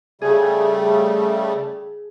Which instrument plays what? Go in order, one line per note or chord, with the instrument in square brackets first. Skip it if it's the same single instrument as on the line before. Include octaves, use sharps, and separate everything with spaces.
[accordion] C#3 G3 A3 [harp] G#4